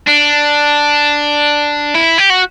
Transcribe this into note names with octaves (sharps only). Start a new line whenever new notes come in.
D4
E4
G4
F#4